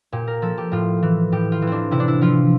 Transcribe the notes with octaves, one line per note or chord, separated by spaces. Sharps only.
A#2 G4
A#4
F3 A4
G4
A2 F4
E3
A2 G4
F4
E3
C4 D4
C3 E4
D4
E4
F3 F4